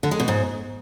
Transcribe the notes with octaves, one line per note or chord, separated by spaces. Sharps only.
D3
G#3
B2
G#2